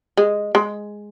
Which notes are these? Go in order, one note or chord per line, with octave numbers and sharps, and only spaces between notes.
G#3
G#3